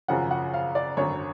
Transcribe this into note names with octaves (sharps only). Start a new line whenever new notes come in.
G#1 F#2 C#3 F3 F#5
F#5
F5
D5
G#1 F#2 D3 C#5